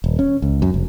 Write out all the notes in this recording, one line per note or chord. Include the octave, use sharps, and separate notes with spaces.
D#1
C#4
C#2
F#2
F1